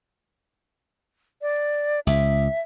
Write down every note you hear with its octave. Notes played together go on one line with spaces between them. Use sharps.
D5
C#2 E5